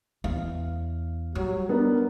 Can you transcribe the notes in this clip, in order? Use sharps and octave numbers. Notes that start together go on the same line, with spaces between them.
E2 F5
F#3 G3
B3 D4 A#4